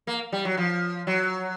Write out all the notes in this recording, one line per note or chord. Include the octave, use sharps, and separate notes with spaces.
A#3
G3
F#3
F3
F#3